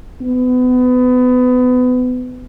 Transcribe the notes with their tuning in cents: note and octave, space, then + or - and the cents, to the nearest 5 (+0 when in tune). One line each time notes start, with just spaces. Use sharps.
B3 +30